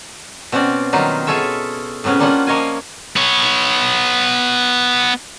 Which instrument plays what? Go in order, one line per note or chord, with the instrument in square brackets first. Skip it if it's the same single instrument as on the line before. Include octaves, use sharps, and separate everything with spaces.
[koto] B2 C4 C#4 F#4 D5
D#3 F#3 G3 D#4 F4
F4 G#4 A4 C#5 E5
A2 C3 B3 C#4 G#4
G3 A#3 C#4 D4 F4 F#5
F3 A#3 C#5 D#5 F5 G#5
[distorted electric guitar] B3 C#5